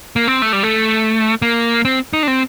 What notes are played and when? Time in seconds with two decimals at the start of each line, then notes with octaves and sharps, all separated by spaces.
0.16 A#3
0.27 C4
0.42 A3
0.53 G3
0.63 A3
1.42 A#3
1.85 C4
2.13 D#4
2.23 D4
2.28 C4